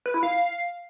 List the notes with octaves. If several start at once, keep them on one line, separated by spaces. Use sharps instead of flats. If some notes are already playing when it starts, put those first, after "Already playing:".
B4
E4
F5